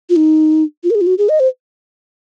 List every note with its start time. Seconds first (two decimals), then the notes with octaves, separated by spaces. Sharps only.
0.10 F4
0.16 D#4
0.84 F4
0.90 A#4
0.95 G#4
1.01 F4
1.07 F#4
1.18 G#4
1.29 D#5
1.40 C5